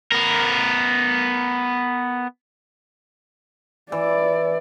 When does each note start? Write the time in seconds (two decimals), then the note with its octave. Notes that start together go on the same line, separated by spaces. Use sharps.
0.12 B3 A#4
3.92 E3 D5